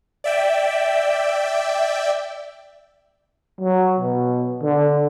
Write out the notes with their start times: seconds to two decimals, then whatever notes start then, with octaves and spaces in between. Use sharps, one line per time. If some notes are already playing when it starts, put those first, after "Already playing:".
0.24 D5 E5 G5
3.60 F#3
3.99 B2
4.63 D3